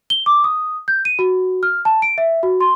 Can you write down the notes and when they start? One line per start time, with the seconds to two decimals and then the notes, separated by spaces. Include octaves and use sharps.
0.10 G7
0.26 D6
0.44 D#6
0.88 G6
1.05 D#7
1.19 F#4
1.63 F6
1.85 A5
2.02 D7
2.18 E5
2.43 F#4
2.61 C6